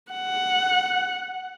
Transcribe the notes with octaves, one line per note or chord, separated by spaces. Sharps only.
F#5